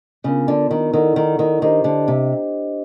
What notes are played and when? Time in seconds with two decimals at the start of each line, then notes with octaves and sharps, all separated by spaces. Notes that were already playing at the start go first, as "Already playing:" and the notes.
0.24 C#3 B3 D4 F4 A#4
0.48 D3
0.71 D#3
0.93 D#3 E4 A4 D5 F#5
1.16 D#3
1.39 D#3
1.62 D#3 D4 G4 C5 D#5
1.84 D3
2.08 C3